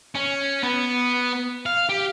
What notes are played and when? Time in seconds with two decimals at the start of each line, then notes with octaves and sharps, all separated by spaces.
0.15 C#4
0.63 B3
1.66 F5
1.89 G4